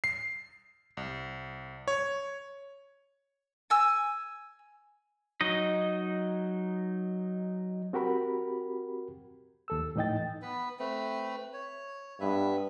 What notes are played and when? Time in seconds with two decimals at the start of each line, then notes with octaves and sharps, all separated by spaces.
0.04 C7
0.97 C2
1.88 C#5
3.70 G#5 E6
5.41 F#3 D#4 D#5
7.93 C4 F#4 G4 A#4 B5
9.68 D#2 A4 E6
9.96 A2 E3 D#4 D#5 G5 A6
10.42 B3 B4
10.79 A3 C4 B4
11.53 C#5
12.20 G2 B3 B4 E5